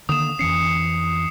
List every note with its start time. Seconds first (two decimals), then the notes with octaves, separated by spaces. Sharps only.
0.09 D3 D#3 A#3 D#6 E7
0.39 F2 E3 C#4 C7 C#7